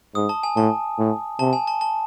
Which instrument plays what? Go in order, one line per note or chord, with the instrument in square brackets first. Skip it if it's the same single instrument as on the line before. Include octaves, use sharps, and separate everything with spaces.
[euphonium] G#2 [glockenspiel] D#6
[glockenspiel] A5
G#5
[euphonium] A2 [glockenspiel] A5
[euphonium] A2
[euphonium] C3 [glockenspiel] A5
[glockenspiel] G#5
A5
A5